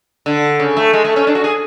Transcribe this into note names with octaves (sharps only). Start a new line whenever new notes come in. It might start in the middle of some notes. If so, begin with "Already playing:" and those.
D3
C#3
A3
G#3
A3
C#4
D4
F#4
G#4